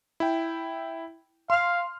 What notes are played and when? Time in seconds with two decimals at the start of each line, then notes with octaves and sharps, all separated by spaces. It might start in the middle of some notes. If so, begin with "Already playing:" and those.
0.20 E4 G5
1.50 F5 C6 F6